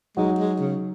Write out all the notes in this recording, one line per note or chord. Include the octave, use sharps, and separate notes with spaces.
F#3 G#3 D#4 F#4
G#3
C#3